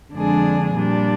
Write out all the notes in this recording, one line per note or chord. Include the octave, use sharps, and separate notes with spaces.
F2 D3 G#3 D4 G#4
A#2 G3 D4